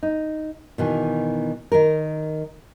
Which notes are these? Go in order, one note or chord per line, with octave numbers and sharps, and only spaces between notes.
D#4
B2 D#3 E3
D#3 A#4